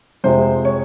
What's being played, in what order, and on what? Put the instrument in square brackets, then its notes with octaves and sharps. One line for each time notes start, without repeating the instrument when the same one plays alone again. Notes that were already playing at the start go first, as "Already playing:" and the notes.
[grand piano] F2 C3 F3 G#3 C5
C#5